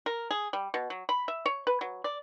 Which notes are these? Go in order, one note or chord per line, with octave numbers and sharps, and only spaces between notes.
A#4
G#4
G3
B2
F#3
B5
E5
C#5
B4
F#3
D5